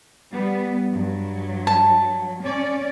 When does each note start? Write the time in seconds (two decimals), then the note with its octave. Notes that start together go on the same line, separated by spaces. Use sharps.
0.32 G3 B3
0.92 G2 F#3
1.67 A5
2.43 C#4 D5